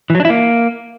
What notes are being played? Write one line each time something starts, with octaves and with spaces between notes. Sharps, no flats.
E3
F#3
D4
E4
A#3